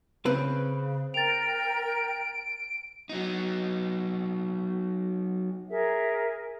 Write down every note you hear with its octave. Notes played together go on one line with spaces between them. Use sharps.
C#3 C4 B4
A#4 G5 A6 D7 F7
F#3 D#4
G#4 A#4 E5